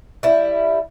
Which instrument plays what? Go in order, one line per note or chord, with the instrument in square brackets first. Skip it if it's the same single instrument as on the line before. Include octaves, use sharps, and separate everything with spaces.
[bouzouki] G3 E4